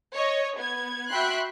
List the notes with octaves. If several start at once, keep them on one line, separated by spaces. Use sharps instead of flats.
C#5 D#5
B3 G#6
F#4 E5 G5 B5 C6 F#6